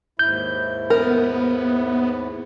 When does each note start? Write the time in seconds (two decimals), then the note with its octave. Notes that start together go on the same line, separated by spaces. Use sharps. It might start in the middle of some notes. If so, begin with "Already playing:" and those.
0.19 D#2 G#2 E4 G6
0.90 B3 A#4